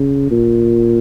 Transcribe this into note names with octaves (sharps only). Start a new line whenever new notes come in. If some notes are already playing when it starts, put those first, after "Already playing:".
Already playing: C#3
A#2